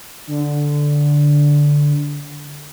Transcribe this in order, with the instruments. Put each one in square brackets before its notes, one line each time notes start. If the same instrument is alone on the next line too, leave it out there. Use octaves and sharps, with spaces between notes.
[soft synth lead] D3